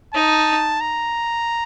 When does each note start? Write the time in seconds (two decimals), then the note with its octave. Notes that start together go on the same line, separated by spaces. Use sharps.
0.14 D#4 A5
0.81 A#5